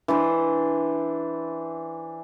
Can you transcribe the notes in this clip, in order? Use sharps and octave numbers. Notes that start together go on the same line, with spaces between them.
E3 D4 C5